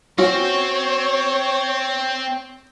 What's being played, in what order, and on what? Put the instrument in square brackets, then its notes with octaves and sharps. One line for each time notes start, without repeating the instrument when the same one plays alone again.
[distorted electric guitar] C4 C5 [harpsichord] C#4 [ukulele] F#4 [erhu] C#5